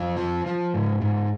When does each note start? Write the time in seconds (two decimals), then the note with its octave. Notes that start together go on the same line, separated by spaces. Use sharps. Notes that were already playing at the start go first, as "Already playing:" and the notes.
Already playing: F2 F4
0.17 F3
0.46 F3
0.74 G#2
1.01 G#2